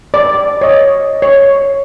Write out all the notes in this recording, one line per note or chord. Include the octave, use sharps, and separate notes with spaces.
D5
C#5 D#5
C#5